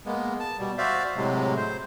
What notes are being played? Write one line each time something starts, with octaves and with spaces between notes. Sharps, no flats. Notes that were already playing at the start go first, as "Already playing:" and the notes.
G#3 A#3 B3
A5
B2 G3
F#4 C5 D5 E5 F5
A2 C3 F#3 G#3
C5